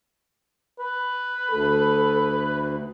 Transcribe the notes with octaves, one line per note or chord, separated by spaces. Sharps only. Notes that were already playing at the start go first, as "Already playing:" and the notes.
B4
D2 A4